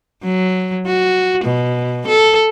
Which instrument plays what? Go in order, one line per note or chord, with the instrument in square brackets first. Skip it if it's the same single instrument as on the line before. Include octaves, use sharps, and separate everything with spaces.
[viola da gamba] F#3
F#4
B2
A4